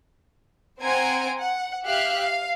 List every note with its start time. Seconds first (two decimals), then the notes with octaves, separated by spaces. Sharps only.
0.80 C4 C5 F#5 G#5 A#5 D7
1.36 F#5
1.84 G4 E5 F5 F6 F#6
2.20 F5